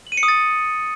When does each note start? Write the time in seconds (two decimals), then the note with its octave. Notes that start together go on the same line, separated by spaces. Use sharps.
0.07 F#7
0.12 D#7
0.17 C#7
0.23 D#6
0.28 A6